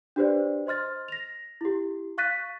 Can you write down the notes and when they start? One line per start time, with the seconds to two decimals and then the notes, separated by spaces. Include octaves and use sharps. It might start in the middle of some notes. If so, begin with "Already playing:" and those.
0.16 D4 F#4 G4 B4 C5 D5
0.66 C5 D#5 C6 F6 A6
1.08 A#6 F7
1.61 E4 G4
2.18 F5 C#6 F#6 A6 B6 D#7